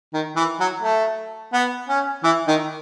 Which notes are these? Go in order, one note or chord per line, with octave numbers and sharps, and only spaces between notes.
D#3
E3
F#3
A3
B3
C#4
E3 E4
D#3 D#4